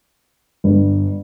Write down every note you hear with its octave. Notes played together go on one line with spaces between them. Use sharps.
G1